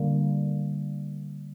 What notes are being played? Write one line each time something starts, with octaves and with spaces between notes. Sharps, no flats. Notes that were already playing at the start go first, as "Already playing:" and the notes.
Already playing: D3 G3 A#3